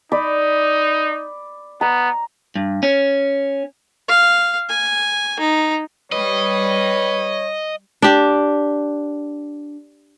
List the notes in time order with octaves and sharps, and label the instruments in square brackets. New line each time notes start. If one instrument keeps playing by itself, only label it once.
[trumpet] D#4 [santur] D5 B5
[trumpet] B3 [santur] A#5
[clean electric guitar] G2
C#4
[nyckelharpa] F5
G#5
D#4
[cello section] G3 [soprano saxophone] B4 [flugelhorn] C#5 [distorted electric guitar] D#5
[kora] D4 G4